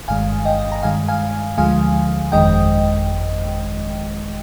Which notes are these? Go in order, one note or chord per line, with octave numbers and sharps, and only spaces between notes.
G1 G2 D#3 G#3 F5 G#5
D#5 G5
A#5
G2 D#3 G#3 F5 G#5
F5 G#5
D2 D3 F3 G#3 F5 G#5
G1 F2 D#3 G#3 D#5 G5